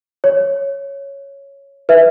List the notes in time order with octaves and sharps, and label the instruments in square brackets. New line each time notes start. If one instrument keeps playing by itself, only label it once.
[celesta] C#5
B4 E5